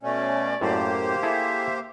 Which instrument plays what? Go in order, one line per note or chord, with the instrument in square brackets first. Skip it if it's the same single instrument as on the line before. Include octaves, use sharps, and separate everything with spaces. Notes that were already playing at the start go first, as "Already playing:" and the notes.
[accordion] B2 A3 C#4 [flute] D5
[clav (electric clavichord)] F#2 A2 [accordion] A#3 G4 C5
[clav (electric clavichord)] E4 G#4 A4 [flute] E5